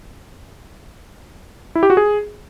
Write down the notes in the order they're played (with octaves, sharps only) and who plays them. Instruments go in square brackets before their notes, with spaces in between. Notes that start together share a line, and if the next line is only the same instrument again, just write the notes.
[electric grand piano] E4
G4
F#4
G#4